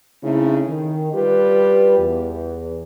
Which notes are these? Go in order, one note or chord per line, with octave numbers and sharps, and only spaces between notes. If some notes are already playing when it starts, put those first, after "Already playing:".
C#3 A3 C4 D#4 E4
D#3
G3 F4 G4 B4
E2